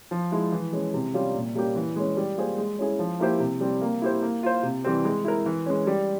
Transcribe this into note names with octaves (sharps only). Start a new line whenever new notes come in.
F3
G#3 E4
E3
G#3 C#4
C3
G3 C#4 F4
A#2
G3 A#3 C#4 G4
E3
G#3 C#4
G3
A#3 F4 G#4 C5
G#3
C#4 E4 G#4
F3
A#3 E4 G4 C5
C3
G3 C4
A#3
E4 G4 C5
A#3
F4 C5
C3
E3 G3 C4
G#3
E4 A#4
E3
G#3 C#4
G3